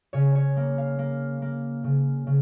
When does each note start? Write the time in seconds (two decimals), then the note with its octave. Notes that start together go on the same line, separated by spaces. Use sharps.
0.13 C#3 C#5
0.35 C#5
0.57 A#3
0.78 F5
0.99 A#3
1.42 A#3
1.84 C#3
2.27 C#3